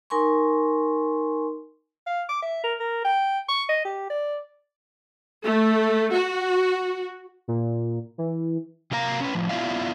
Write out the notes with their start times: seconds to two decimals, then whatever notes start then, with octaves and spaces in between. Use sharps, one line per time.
0.10 D#4 A#4 G#5 C6 C#6
2.07 F5
2.29 D6
2.42 E5
2.63 A#4
2.80 A#4
3.04 G5
3.49 C#6
3.69 D#5
3.85 G4
4.10 D5
5.44 A3
6.12 F#4
7.48 A#2
8.18 E3
8.91 C3 F#3 A#4 F5 A#5
9.20 C#4 B4
9.35 A2 F3
9.49 B3 E4 F4 D5 E5 F5